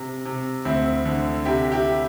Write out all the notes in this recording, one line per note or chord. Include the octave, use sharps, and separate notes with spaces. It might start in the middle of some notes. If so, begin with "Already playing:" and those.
Already playing: C3
C3
D2 C4 E4
D3
C3 E4 G4
E4 G4